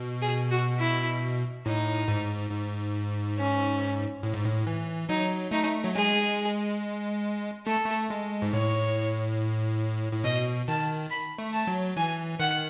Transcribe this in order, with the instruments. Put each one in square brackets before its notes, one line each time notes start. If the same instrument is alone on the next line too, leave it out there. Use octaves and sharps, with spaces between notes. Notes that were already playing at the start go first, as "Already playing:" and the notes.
Already playing: [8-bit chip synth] B2
[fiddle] G#4
F#4
E4
[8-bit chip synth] A2 [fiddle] D#4
[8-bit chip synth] G#2
G#2
[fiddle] C#4
[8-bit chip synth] A2
G#2
A2
E3
[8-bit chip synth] F#3 [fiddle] D#4
[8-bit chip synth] A3 [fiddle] D#4
[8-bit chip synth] F#3
[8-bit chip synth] G#3 [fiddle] G#4
[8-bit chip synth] A3 [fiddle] A4
[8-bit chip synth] A3
G#3
G#2
[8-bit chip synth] A2 [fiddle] C#5
[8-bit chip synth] A2
[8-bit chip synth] B2 [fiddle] D#5
[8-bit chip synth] D#3 [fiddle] A5
[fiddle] B5
[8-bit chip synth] A3
[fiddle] A5
[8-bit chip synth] F#3
[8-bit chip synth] E3 [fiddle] G#5
[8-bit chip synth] D#3 [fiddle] F#5